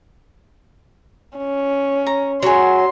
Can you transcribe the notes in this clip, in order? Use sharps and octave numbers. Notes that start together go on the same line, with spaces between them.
C#4
A#5
F#3 G#4 C#5 C6